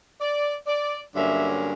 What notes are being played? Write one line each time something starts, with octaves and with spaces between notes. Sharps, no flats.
D5
D5
G2 D3 F#3 A#3 C#4 E5